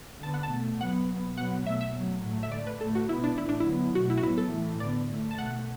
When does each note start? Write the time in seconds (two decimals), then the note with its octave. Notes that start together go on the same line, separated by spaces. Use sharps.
0.23 D3 B3 A5
0.34 F#5
0.43 A5
0.52 B2 A3
0.80 B2 F#3 B3 F#5
1.09 B2 B3
1.37 B2 F#3 B3 F#5
1.66 B2 A3 E5
1.81 E5
1.95 B2 F#3 A3
2.23 A2 F#3 A3
2.43 E5
2.52 D3 A3 D5
2.67 B4
2.81 A2 A3 A4
2.95 F#4
3.09 B2 B3 E4
3.24 D4
3.38 A2 E3 A3 E4
3.49 D4
3.60 E4
3.66 D3 F#3 B3
3.95 B2 A3 F#4
4.10 E4
4.17 F#4
4.23 A2 F#3 B3 E4
4.38 A4
4.52 A2 E3 A3
4.80 D3 B3 D5
5.09 A2 A3
5.31 A5
5.38 B2 A3 F#5